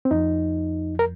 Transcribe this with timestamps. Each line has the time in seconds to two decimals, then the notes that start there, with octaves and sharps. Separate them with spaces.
0.05 C4
0.11 F2 F3 D#4
0.99 A#4